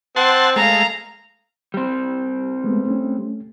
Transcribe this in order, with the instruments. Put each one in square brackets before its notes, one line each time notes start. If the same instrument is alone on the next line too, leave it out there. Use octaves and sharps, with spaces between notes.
[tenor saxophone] C4 [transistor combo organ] F#5 A5 C6
[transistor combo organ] G#3 A3 [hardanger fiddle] F5 A#5
[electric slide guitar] G3 C4
[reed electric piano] G#3 A3 B3
A3 C#4